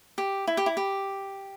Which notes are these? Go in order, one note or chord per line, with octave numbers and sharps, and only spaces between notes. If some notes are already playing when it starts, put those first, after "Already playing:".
G4
E4
G4
E4
G4